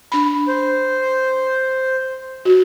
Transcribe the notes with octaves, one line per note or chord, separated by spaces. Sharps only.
D4 B5
C5
F#4